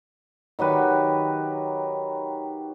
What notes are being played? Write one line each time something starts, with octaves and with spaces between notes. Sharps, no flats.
D#3 F#3 G4 B4